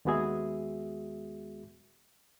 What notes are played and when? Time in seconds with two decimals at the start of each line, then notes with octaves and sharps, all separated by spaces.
0.05 D#2 G#3 B3 F#4 G#4 E5